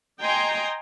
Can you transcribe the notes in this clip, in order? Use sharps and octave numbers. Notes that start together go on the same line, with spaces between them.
D#5 G5 G#5 A#5 C6